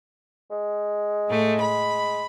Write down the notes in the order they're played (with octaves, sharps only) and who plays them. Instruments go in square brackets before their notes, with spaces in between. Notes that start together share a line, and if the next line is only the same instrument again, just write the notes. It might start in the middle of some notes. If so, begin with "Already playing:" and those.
[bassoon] G#3
[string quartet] A2 A3
B5